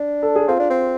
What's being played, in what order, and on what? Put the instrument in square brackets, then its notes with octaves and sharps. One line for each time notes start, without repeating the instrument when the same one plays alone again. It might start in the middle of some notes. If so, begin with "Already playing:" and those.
Already playing: [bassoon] D4
[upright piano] A4
G#4
[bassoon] C4 [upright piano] F4
[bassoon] D4
C4